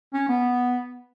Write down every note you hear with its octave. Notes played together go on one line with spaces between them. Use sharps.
C#4
B3